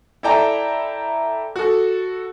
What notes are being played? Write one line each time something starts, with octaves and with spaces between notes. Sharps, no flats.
E4 A4 D5 G5 A5 A#5
F#4 A4